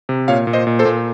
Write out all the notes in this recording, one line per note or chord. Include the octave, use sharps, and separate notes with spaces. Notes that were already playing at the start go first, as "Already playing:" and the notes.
C3
A#2 C#5 F5
A#2
C5 D#5
A#2
A4 C5
A#2